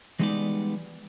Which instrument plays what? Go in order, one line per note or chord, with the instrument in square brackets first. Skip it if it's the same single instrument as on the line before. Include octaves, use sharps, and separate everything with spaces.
[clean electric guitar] E3 G3 G#3 B3 D#4 D5